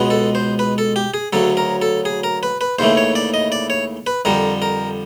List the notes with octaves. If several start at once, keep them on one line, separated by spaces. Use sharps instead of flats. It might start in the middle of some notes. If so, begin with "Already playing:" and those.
Already playing: C#2 B2 G#3 B3
A4
C5
B4
A4
G4
G#4
D2 C#3 F#3 A4
A#4
A4
G#4
A#4
B4
B4
D#2 C#3 E3 A3 C5
C#5
D5
D#5
D5
C#5
B4
F2 D3 G3 A#4
A#4